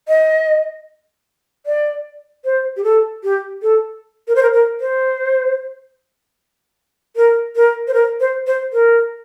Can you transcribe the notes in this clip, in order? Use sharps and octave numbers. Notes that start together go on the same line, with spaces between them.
D#5
D5
C5
G4
A4
G4
A4
A#4
C5
A#4
A#4
C5
A#4
A#4
C5
A#4
C5
C5
A#4